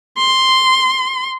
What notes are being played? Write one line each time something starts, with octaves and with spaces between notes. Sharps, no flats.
C6